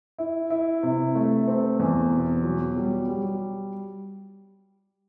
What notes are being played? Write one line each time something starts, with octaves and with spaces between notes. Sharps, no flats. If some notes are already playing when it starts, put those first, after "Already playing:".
E4
E4
C3
A3
C4
E2
B2
F#3
G3
G3